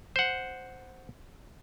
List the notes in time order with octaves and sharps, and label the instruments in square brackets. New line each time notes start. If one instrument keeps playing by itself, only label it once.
[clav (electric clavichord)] C5 F#5